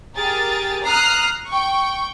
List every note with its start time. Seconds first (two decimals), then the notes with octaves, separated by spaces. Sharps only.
0.15 G4 G#4 A#4 A6
0.84 A#5 D#6 F6 F#6 C7
1.47 G5 C#6